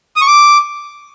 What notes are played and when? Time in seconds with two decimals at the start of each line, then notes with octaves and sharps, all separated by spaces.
0.16 D#6
0.21 C#6
0.27 D6